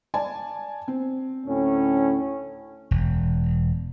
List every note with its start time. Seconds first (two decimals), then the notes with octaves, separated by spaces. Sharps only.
0.14 D5 G#5 A5
0.88 C4
1.46 D2 A2 C#4
2.91 E1